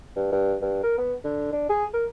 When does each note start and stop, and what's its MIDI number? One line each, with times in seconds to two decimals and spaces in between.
0.16 0.28 43
0.32 0.55 43
0.61 0.81 43
0.83 0.97 70
0.98 1.14 59
1.24 1.51 50
1.52 1.66 62
1.69 1.85 68
1.93 2.05 70